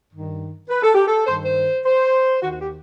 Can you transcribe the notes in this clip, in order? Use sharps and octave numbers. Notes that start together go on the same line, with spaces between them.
G2 D#3
B4
A4
G4
A4
G2 D#3 C5
C5
C5
D#2 D#3 F#4
F#4
G4